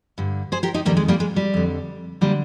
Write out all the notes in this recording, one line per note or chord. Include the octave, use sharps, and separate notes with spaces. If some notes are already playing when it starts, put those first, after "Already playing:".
G2 D3
G#4 C5
G4 A#4
D#4 G4
F2 C3 D#3 G3 A#3
G#3
G3 A#3
G#3
G3
F2 D3
D3 G3 A#3